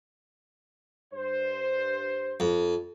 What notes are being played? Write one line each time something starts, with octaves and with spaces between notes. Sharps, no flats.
G2 C5
F2